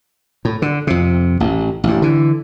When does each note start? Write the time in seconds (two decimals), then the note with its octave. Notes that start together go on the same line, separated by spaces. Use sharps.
0.45 A2
0.62 D3
0.87 F2 C3
1.40 A1
1.84 A1 G2
2.02 D3 E3